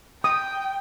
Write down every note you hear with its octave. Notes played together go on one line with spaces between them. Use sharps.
G5 D#6